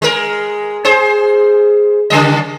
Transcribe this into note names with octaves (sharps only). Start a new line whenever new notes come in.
G#3 A#4
G#4 C5
C#3 G3 D#5